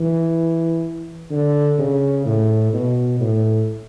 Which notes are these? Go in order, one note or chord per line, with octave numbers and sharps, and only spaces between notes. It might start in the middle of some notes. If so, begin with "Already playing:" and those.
Already playing: E3
D3
C#3
A2
B2
A2